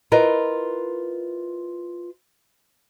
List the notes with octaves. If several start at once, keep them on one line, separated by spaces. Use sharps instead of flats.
E4 F4 A#4 B4 D#5